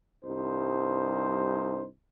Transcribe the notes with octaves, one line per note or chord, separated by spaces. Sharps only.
C2 G2 D#4 C5